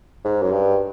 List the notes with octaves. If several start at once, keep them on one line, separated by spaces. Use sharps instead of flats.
G#2
F#2
G2